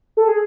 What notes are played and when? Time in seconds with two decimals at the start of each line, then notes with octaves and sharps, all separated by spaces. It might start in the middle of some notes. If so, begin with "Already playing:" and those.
0.17 A4
0.28 G#4